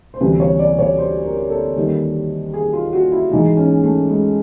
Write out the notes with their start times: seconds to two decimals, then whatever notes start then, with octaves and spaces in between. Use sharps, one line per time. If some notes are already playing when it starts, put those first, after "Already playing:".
0.14 C5
0.20 D2 C3 E3 G3 B4
0.40 C#5
0.59 D5
0.79 C#5
0.98 C5
1.24 A#4
1.50 A4
1.76 D#2 D#3 G3
2.54 G#4
2.73 F4
2.93 F#4
3.12 E4
3.31 G#2 E3 G#3 D#4
3.57 C#4
3.84 A3
4.10 G#3